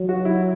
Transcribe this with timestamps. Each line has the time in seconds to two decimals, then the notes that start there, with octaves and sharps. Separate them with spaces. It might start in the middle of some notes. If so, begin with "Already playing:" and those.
Already playing: F#3
0.09 F#4
0.25 E4